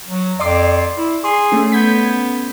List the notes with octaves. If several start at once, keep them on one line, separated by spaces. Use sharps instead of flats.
F#3
F2 D5 C6 D6
E4
G#4 C6
A3 C#4
B3 G6 G#6 B6